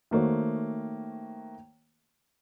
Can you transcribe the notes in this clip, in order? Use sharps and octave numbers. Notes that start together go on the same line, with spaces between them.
D#3 A3 A#3 F#4 C5 C#5